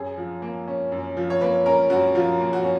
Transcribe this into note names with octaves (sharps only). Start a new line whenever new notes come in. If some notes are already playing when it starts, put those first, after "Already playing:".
Already playing: F#2 G#4
F3
A#3
C#4
F#2
F3
C#5
A#3 B4
C#4 A#4
F#2 F#4
F3 F4
A#3
F#4
C#4